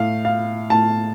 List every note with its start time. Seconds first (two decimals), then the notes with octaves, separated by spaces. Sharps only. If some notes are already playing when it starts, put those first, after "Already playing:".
Already playing: A2 F5
0.25 F5
0.70 A2 A5